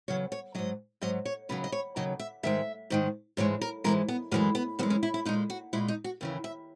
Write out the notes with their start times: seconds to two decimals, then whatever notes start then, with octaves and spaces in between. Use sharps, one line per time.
0.08 E2 C#3 F#3 C#5
0.32 C#5
0.55 G#2 F#3 D#5
1.02 G#2 F#3 D#5
1.25 C#5
1.49 D#2 C#3 F#3 B4
1.64 D#5
1.72 C#5
1.96 D#2 C#3 F#3 D#5
2.19 E5
2.43 G#2 D#3 G#3 E5
2.90 G#2 D#3 G#3
3.37 G#2 E3 G#3 C#5
3.61 A#4
3.84 G#2 E3 G#3 A#4
4.08 B3
4.31 F#2 E3 G#3 A#3
4.55 B3
4.79 F#2 E3 G#3 B3
4.90 C#4
5.03 E4
5.14 E4
5.25 A#2 G#3 D#4
5.50 F#4
5.73 A#2 G#3 E4
5.88 D#4
6.04 F#4
6.21 D#2 C#3 E3
6.44 E5